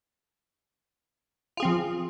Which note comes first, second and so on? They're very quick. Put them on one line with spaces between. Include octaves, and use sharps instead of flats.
F4 G#4 C4 F3